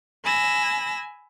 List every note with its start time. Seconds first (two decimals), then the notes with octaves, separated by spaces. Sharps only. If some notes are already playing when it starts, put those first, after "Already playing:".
0.24 G#5 B5 E6 A#6